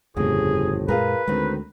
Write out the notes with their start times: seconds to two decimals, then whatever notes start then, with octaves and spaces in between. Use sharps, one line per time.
0.17 G1 F2 A2 C#3 C4 G#4
0.88 F#2 A#2 G#3 F4 G#4 A#4 B4
1.28 D2 D#3 G#3 C4